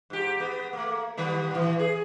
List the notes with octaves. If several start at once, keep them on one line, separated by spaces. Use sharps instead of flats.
G#2 G4
B3
A3 A#3
D#3 G3 B3
A#2 E3
G#4